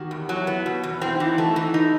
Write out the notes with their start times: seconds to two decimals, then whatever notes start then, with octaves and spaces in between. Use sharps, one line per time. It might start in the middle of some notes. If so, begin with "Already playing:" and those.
Already playing: D#3 F#4 G4
0.11 E2
0.29 F#3 E4
0.47 B3
0.66 B2
0.84 E2
1.02 C4 E4
1.14 D#4
1.20 E3 E4
1.38 A3 F#4
1.56 E3
1.74 D#4